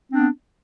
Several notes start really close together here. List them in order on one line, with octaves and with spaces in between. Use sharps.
C4 D4 B3